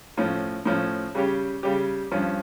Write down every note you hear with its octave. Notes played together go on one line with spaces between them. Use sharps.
A2 F3 C#4
A2 F3 C#4
C#3 G3 C#4 G4
C#3 G3 C#4 G4
G2 F3 C#4